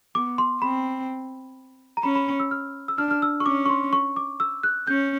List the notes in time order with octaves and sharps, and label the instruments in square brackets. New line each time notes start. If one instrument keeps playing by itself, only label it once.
[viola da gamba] B3 [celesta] D6
[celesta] C6
[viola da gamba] C4 [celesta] B5
[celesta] A#5
[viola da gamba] C#4 [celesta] B5
[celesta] B5
E6
F6
E6
[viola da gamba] D4 [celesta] F6
[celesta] F6
E6
C#6
[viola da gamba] C#4 [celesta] D6
[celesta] C#6
C6
C#6
D6
E6
F#6
[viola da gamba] C#4 [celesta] G6